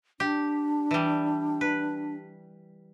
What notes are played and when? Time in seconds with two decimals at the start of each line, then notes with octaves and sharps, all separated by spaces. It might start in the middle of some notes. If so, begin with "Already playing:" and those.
0.20 D4 G4
0.91 E3 G3
1.61 B4